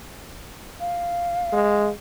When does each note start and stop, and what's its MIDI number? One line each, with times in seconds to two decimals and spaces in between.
0.80 1.88 77
1.53 1.91 56